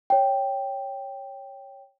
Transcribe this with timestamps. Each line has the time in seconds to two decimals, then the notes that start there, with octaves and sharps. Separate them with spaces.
0.10 C#5 G5